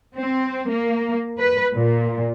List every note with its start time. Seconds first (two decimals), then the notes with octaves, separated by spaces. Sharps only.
0.16 C4
0.69 A#3
1.39 B4
1.74 A#2